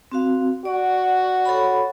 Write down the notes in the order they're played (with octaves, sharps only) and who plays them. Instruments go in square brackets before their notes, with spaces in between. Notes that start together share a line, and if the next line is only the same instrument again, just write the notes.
[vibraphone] C4 F#4 F5
[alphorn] F#4 [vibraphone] D5
[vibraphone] A4 C#5 B5